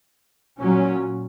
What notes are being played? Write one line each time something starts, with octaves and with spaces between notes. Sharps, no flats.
A#2 F#3 C#4